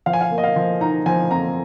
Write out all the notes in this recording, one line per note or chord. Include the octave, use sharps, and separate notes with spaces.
F3 F5
G#5
F5
A#3
D#5
F5
F3
D#4 A#5
F3 G#5
F2 A#5